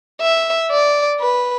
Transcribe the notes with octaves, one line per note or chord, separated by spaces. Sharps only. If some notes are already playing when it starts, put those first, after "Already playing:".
E5
D5
B4